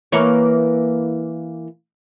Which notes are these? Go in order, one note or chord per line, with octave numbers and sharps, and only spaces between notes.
E3 A#3 C#5